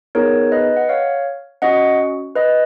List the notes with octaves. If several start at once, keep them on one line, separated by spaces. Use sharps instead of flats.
B3 D#4 G#4 A#4 C#5
B4 D#5
F#5
C#5 F5
C#4 F#4 D#5 F#5
B4 D#5